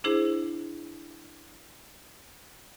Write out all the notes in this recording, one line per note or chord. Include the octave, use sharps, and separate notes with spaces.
D4 E4 G#4 C5